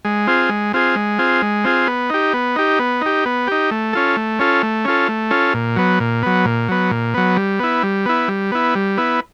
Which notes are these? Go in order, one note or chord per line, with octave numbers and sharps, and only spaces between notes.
G#3
C4 F4 G#4
G#3
C4 F4 G#4
G#3
C4 F4 G#4
G#3
C4 F4 G#4
B3
D#4 G4
B3
D#4 G4
B3
D#4 G4
B3
D#4 G4
A3
C#4 F4 A4
A3
C#4 F4 A4
A3
C#4 F4 A4
A3
C#4 F4 A4
A#2
F#3 B3
A#2
F#3 B3
A#2
F#3 B3
A#2
F#3 B3
G3
B3 E4
G3
B3 E4
G3
B3 E4
G3
B3 E4